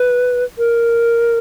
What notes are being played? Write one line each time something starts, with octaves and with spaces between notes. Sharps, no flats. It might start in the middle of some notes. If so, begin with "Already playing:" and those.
Already playing: B4
A#4